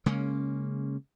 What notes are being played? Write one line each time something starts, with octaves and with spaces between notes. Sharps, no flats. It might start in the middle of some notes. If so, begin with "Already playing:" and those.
C#3 G#3 A#3 C#4